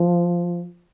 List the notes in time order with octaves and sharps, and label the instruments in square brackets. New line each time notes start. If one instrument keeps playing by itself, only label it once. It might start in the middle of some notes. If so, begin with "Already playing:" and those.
Already playing: [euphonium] F3